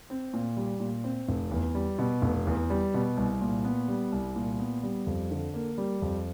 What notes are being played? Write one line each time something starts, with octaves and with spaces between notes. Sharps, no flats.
C4
A#2
G3
A#2
C4
F1
E2
G3
B2
F1
E2
G3
B2
C2
A#2
B3
G3
C2
A#2
B3
G3
F2
D3
A#3
G3
F2